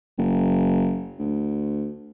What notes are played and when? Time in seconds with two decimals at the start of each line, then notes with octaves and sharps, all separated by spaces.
0.18 F#1
1.19 D2